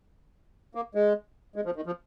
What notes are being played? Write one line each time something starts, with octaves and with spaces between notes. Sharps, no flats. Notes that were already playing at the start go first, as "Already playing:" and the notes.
A#3
G#3
G#3
F3
D#3
F3